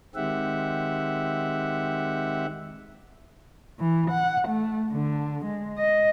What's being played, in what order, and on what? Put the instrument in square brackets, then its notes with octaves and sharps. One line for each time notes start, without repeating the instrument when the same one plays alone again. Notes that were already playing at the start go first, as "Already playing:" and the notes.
[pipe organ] D#3 G#3 C4 G4 E5 F#5
[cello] E3
F#5
A3
D3
G#3
D#5